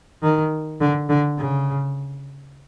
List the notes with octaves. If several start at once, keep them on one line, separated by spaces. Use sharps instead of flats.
D#3
D3
D3
C#3